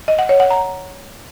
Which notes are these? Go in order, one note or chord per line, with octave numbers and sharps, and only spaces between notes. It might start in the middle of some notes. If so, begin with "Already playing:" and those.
D#5
F#5
C#5
F#5
A#5